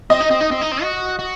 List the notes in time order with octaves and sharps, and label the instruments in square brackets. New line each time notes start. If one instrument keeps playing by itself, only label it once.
[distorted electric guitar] C4 [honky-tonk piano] D#5
[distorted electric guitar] D#4
C4
D#4
C4
D#4
C4
F#4
F#4